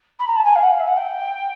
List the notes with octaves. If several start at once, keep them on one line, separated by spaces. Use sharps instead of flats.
B5
A#5
A5
G#5
F5
F#5
F5
E5
F#5
G5